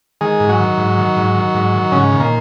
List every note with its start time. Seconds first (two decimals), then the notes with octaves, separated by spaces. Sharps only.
0.21 D#3 G#3 G#4
0.40 G#2
0.49 F#3 F#4
0.59 D#3
0.78 G#2
0.97 D#3
1.16 G#2
1.35 D#3
1.54 G#2
1.73 D#3
1.92 G#2 C#3 C#4
2.11 D#3
2.20 A#2 A#3